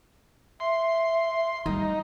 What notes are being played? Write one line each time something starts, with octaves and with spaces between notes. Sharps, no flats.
E5 C6
G3 D#4 D#5